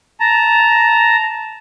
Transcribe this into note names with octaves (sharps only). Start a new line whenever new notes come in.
A5 A#5